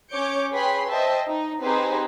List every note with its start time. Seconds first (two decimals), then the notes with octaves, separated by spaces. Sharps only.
0.12 C#4 C#5 D6 G6 C#7 D7
0.53 G#4 B4 C#5 G5 B5 C6
0.90 C5 D#5 E5 G5 A5
1.26 D#4
1.61 C4 D#4 G4 G#4 B4 C5